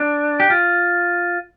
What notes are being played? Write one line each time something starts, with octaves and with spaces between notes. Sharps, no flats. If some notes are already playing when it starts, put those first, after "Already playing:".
Already playing: D4
G4
F4